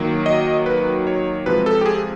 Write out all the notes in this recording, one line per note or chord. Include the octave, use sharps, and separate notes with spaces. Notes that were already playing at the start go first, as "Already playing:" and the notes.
Already playing: D#3 F#3 A#3
D#5
B4
C#5
C3 F3 G#3 B4
A4
G4
G#4